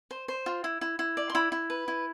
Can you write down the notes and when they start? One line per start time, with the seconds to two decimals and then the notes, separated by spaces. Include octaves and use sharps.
0.11 C5
0.28 C5
0.46 F4
0.64 E4
0.81 E4
0.99 E4
1.17 D5
1.30 C6
1.35 E4 B5
1.52 E4
1.70 B4
1.88 E4